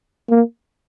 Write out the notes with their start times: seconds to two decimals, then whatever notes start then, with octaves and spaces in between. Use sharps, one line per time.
0.30 A#3